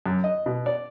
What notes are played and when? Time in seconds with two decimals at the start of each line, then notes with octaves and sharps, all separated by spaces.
0.06 F#2
0.24 D#5
0.46 B2
0.66 D5